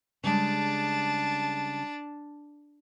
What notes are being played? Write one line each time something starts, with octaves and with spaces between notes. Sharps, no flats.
C#3 G3 G#3 D4 A5